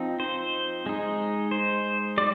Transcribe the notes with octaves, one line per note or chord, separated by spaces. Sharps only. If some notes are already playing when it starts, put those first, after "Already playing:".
Already playing: F3 C4 D#4
C5
G#3 D#4
C5
G3 D5